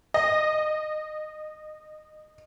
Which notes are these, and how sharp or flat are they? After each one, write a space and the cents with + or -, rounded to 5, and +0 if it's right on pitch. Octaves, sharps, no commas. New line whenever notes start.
D#5 -20